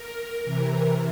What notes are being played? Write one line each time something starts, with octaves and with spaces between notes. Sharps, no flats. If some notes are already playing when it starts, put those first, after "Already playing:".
Already playing: A#4
C3 E3